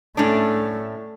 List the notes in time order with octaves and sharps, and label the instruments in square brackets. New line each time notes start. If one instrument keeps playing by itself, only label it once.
[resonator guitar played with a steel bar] A2 C#4 D4 [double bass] A3